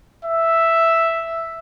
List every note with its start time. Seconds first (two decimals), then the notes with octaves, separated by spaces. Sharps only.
0.24 E5